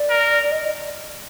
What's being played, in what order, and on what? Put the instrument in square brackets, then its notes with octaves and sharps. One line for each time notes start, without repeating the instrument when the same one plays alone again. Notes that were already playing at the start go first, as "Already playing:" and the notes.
Already playing: [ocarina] D5
[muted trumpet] A#4
[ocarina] D#5